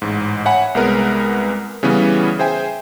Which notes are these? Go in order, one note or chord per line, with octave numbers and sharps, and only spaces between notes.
A1 G#2
C#5 E5 F#5 G#5 B5
C2 G#3 B3 A#4 B4
C#3 E3 G3 B3 C#4
G#4 C5 E5 G5 G#5